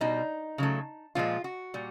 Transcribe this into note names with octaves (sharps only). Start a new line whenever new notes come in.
B2 G3 D#4
C#3 F#3 A3
A#2 F3 G#3 F4
F#4
A#2 G3